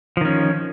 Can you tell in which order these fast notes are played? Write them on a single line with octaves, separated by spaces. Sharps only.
F3 D#3 C#4